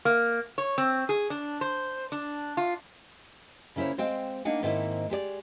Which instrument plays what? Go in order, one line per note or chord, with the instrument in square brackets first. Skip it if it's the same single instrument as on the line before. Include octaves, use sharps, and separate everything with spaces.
[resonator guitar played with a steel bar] A#3
C#5
C4
G#4
D4
C5
D4
F4
[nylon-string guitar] C#3 A#3 E4 C5 C#5
G#3 C4 C5 F5 G5
A#3 D4 D#4 F#5 G5
G#2 D#3 A#3 C4 E4
G#3 G4 A4 D5